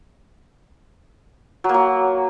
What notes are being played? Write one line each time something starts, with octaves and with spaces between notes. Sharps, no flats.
F#3
A#3
F#3